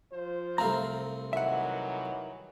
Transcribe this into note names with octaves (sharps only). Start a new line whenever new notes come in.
F3 F4 C5
C2 A3 C4 F5 A#5
D#3 E3 F#3 E5 F#5